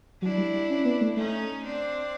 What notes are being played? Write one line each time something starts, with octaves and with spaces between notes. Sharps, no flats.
F#3 D4 E4
G3
G3
C#4
B3
A3
A3 C#4 D#4
C4 D4